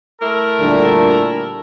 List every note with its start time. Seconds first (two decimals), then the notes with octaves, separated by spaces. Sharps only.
0.21 A3 E4 A#4
0.60 A#2 D3 G3